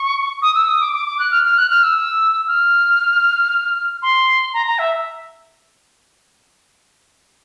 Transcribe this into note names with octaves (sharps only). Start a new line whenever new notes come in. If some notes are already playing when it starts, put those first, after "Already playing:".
Already playing: C#6
D#6
E6
D#6
D6
D6
D6
F#6
F6
F6
F#6
F6
E6
F6
C6
A#5
A#5
E5